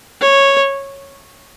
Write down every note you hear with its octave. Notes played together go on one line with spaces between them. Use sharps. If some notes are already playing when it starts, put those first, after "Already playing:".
C#5